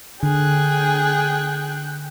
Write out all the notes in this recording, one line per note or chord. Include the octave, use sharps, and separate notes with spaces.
D3 G#4 G5 F#6